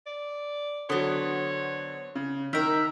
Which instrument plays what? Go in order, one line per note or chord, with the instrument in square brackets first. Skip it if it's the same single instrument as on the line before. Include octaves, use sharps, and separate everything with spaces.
[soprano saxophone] D5
[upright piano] D3 F#3 [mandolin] B3 C5 [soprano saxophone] C#5
[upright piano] C#3
[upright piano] D#3 [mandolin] A#4 E5